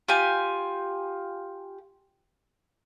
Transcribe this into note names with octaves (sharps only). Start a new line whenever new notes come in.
F4 G4 G#5